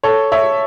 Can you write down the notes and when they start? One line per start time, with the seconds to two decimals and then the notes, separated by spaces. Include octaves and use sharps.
0.04 A4 C#5
0.32 C#5 E5